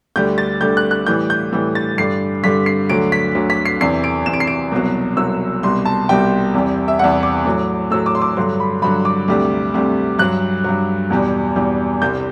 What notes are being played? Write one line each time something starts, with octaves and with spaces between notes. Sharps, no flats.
D2 D3 G3 G6
A6
D2 D3 G3 G6
F#6
F#6
A2 E3 G3 G6
G6
A2 E3 G3
A6
G2 D3 G3 C7
G2 D3 G3 B6
C7
D2 D3 F#3 D7
B6
D2 D3 F#3
B6
C7
E2 C3 E3 C7
D7
E2 C3 E3 E7
D7
C7
D7
C2 B2 F#3
C2 B2 F#3 E6
C2 B2 G3 C6
A5
C2 B2 G3 G5
E2 C3 G3
E5
E2 C3 G3 F#5
D6
A2 F#3
A2 F#3 E6
D6
C6
D6
G2 D3 F#3 C6
B5
G2 D3 F#3 B5
D6
D2 C3 G3
D2 C3 G3
G2 F#3 F#6
G2 F#3
E2 B2 G3
E2 B2 G3
C2 C3 G3 G6